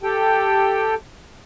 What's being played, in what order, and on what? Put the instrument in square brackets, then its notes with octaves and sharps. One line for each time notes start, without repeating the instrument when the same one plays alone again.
[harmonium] G4 A4 G5